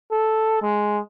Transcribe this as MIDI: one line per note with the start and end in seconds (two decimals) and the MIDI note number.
0.12 0.60 69
0.62 0.99 56